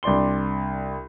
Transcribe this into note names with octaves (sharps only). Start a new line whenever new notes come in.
C2 D4 D5 C6 G7